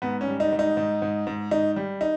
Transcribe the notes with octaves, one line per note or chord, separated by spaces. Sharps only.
G#2 B3
C#4
G3
D#4
G#2
D#4
G#2
G#2
G#2
G#2 D#4
G3
D#4